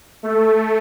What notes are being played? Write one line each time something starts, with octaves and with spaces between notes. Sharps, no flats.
A3